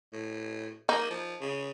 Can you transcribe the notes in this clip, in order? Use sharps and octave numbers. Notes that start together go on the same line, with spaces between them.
A2
A#3 D#4
F3
C#3